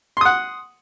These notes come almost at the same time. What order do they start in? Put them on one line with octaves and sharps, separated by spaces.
C6 D#6 F#5